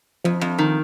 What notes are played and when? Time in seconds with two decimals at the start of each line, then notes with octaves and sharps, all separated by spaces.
0.24 F2 F3
0.41 F2
0.58 D#3